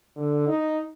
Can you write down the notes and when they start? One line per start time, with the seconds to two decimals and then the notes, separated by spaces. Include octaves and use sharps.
0.16 D3
0.47 D#4